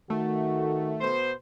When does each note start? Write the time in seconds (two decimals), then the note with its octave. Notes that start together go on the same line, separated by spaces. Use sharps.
0.10 D#3 A3 F#4
1.00 B2 B3 C5